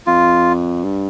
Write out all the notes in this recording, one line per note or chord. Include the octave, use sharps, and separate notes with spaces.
F2 F4
G2